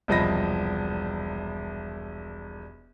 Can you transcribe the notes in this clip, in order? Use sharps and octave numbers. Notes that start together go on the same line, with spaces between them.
E1 C2 F3 D#5 B5 A#6